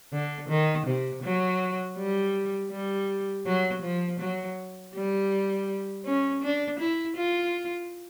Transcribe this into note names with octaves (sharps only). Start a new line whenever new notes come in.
D3
D#3
C3
F#3
G3
G3
F#3
F3
F#3
G3
C#4
D4
E4
F4